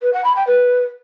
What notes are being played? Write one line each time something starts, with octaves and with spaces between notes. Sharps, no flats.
B4
F#5
B5
G5
B4